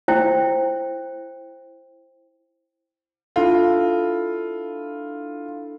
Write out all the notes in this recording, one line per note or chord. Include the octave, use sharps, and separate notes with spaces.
E4 C5 G5
D4 E4 F4 A4